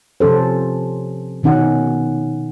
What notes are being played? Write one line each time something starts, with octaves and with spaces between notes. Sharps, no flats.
C3 F3 C#4 A4 C5
B2 D#3 C#4 D#4 F#5